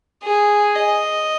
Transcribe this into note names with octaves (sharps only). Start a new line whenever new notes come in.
G#4
D#5